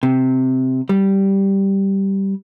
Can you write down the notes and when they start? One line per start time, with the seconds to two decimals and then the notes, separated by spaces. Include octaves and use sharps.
0.03 C3
0.89 G3